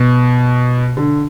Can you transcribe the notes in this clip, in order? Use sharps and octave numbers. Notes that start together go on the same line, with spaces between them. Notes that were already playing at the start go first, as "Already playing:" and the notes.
Already playing: B2
D3